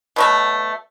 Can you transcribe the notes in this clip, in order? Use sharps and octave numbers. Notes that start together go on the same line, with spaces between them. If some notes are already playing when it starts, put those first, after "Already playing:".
B2 F#3 A3